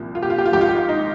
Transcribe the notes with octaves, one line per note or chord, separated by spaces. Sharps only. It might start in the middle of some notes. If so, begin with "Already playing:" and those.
Already playing: C2 A#2 F3
F4
G4
F4
G4
F4
G#1 G#2 F3 G4
F4
G4
F4
D#4